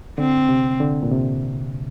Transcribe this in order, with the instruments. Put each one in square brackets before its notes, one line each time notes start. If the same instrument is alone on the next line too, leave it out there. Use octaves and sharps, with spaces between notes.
[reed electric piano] D3 [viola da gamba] C4
[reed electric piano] C3
D3
A#2
C3